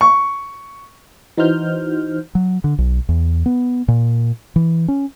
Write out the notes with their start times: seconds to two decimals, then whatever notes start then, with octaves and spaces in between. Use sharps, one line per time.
0.01 C#6
1.37 E3 D#4 F#4 C5 F6 G6
2.35 F#3
2.64 D3
2.78 B1
3.09 E2
3.46 B3
3.88 A#2
4.56 E3
4.88 C#4